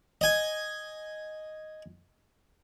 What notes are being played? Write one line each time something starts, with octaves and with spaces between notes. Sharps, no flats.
D#5 G#5